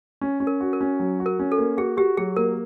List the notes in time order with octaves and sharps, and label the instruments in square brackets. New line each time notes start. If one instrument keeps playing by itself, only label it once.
[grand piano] C#4
C#4
[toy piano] A#4
[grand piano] F#4
[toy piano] A#4
[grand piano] C#4
F#3
F#4
[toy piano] A#4
[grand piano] C#4
[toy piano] A4
[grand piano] A#3
[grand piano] F#4 [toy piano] G#4
[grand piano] F#4 [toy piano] G4
[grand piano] F#3 [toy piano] G#4
[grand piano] A#3 [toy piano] A#4